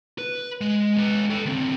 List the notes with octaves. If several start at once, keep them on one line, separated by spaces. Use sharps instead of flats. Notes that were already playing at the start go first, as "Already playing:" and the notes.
B4
G#3
G#3 B4
A4 G5
D2 C4